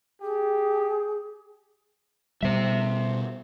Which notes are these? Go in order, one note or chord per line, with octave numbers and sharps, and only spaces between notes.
G4 G#4
B2 G3 C5 E5